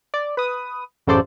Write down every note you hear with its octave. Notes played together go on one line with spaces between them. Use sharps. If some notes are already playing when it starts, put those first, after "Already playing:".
D5
B4 D#6
A1 F#2 C#3 A4 C5 D5